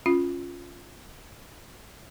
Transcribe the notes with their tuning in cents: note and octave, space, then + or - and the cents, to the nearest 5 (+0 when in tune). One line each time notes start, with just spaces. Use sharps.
C#4 +0 F4 +0